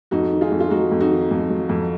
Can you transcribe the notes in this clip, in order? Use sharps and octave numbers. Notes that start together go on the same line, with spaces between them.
F2 D#4 F#4
D#3
F4 G#4
F2
F4
F#3 D#4 F#4
F2
D#4 F#4
D#3
F2
F#3
F2